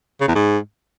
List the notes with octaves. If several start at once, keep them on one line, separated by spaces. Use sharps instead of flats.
C#3
E2
G#2